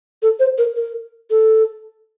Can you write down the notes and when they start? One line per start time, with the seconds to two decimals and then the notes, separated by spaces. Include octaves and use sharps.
0.22 A4
0.40 C5
0.58 A#4
0.76 A#4
1.30 A4